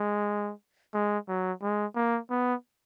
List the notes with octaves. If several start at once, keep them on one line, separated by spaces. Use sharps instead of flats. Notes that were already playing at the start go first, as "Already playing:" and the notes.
Already playing: G#3
G#3
F#3
G#3
A#3
B3